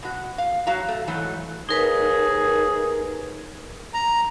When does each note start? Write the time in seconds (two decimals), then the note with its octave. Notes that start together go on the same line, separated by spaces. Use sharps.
0.03 B2 F#4
0.38 F5
0.67 F#3 F#4 F5 A#5
0.88 A3
1.08 G#2 E3 F#3 A3
1.69 D#2 D#4 G#4 A#4 B4
3.94 A#5